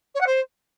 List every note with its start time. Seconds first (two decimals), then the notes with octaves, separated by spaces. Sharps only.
0.15 C#5
0.21 F#5
0.27 C5